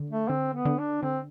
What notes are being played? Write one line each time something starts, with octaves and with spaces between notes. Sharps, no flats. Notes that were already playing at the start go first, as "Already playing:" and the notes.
Already playing: D3
A3
D3 C4
B3
D3
D4
D3 C4